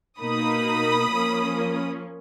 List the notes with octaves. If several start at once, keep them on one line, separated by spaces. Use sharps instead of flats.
B2 A#3 D#4 B5 D#6
F3 A#3 C#4